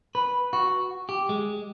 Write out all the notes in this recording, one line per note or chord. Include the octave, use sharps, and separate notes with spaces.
B4
F#4
G4
G#3